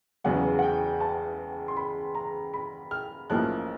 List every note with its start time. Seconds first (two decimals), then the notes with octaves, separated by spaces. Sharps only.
0.24 E1 E2 C#3 F#3 B3 F#5
0.59 F#5
0.62 G5
1.01 A5
1.68 C6
1.77 B5
2.15 A#5
2.54 B5
2.91 F6
3.30 B1 A2 F3 A#3 C#4 F#6